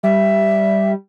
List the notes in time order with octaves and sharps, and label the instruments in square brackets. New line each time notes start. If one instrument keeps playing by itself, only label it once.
[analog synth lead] G3 [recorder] E5